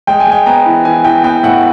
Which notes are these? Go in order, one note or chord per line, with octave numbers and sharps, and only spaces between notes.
G#3 G5
G#5
G#3 G5
B3 A#5
E3
E3 G#5
E3 G5
B3 G5
A2 F#5